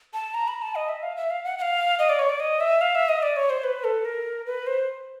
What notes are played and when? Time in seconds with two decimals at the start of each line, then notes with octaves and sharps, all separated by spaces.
0.13 A5
0.34 A#5
0.48 B5
0.62 A5
0.75 D#5
0.89 E5
1.03 F5
1.17 E5
1.30 F5
1.44 F#5
1.58 F#5
1.62 F5
1.99 D#5
2.09 D5
2.19 C#5
2.29 D5
2.40 D#5
2.61 E5
2.81 F5
2.95 E5
3.09 D#5
3.22 D5
3.36 C#5
3.50 C5
3.64 B4
3.84 A4
4.05 A#4
4.46 B4
4.67 C5